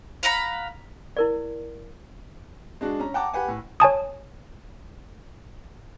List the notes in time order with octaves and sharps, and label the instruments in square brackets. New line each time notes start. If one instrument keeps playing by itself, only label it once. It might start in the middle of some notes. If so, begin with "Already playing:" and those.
[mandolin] F5 F#5 A#5 B5
[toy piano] E4 A#4 D5
[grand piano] G#3 D4 F#4
C#4 A#5
F#5 G5 A5 A#5 D6
G4 B4 F#5 G#5
A2
[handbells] C#5 G#5 A5 D#6